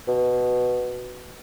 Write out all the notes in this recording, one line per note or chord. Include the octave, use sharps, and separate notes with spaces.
B2